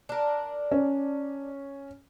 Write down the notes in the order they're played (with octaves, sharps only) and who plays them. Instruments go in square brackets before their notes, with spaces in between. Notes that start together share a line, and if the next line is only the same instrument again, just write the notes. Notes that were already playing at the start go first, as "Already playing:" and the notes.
[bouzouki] D4 A#4
[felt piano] C#4